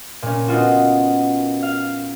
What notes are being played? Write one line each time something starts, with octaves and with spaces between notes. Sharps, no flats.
A#2 C#4
B3 D#4 F4 F#4
F5